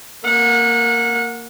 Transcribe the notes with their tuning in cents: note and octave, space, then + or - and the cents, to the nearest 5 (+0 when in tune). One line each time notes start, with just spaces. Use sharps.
A#3 -10 F#5 -30